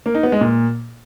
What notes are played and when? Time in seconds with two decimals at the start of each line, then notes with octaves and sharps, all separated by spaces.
0.06 A#3
0.15 D#4
0.23 B3
0.32 G#3
0.41 A#2